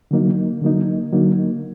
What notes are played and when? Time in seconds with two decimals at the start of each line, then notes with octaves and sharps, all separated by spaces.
0.11 D3 F#3 A#3 D#4
0.62 D3 F#3 A#3 D#4
1.13 D3 F#3 A#3 D#4